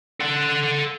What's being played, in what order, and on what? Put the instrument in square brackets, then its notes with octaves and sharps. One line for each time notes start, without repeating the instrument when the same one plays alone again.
[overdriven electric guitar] A4 F#5